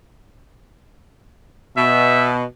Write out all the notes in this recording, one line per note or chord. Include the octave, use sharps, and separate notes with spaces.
B2 E5